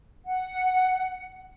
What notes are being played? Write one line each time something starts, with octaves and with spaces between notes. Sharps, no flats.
F#5